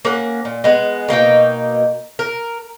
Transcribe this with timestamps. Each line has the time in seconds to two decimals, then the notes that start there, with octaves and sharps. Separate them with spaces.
0.05 A#3 C#4 F#5
0.45 A#2
0.64 G#3 B3
1.09 B2 A#3 D#4 G5
2.19 A#4